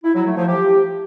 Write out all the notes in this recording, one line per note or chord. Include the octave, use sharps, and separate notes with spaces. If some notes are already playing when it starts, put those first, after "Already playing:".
E4
F#3
A3
F3
G4